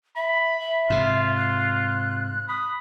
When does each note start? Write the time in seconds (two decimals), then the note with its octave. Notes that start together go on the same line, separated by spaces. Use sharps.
0.16 E5 B5
0.60 E5
0.90 G#2 C3 F4
1.36 F#6
2.48 B5 D#6